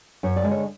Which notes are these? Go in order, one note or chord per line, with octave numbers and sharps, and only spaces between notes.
F#2 C#5
D5
D3 G#3
C#5